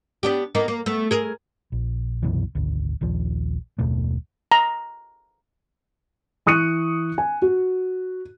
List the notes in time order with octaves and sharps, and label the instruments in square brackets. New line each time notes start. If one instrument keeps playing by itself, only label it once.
[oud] B3 D4 G4
A#3 B3 D#4
A#3
A3 B3
G#4 A#4
[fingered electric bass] A#1
C2 F#2 B2 E3
G#1 D2
A#1 D#2 F3
F#1 D#2 B2 A3
[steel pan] A#5
[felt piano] E3 C#6 D#6 F#6 C#7 D#7
G#5
F#4